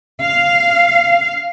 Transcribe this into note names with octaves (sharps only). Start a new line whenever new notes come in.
F5